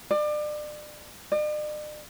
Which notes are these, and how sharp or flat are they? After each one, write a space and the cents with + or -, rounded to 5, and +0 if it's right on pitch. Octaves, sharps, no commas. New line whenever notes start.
D5 +30
D5 +45